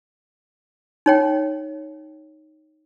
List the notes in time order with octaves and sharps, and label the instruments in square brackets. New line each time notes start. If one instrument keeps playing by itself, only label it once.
[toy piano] D#4 C#5 G5